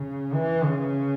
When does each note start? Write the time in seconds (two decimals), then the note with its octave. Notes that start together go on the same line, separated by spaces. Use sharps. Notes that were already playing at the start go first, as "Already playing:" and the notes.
Already playing: C#3
0.34 E3
0.64 C#3